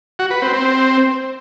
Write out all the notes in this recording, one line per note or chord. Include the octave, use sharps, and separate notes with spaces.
F#4
B4
C4
C4